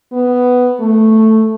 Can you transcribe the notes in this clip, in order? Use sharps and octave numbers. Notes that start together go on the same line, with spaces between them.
B3
A3